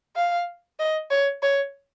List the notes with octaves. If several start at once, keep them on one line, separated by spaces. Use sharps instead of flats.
F5
D#5
C#5
C#5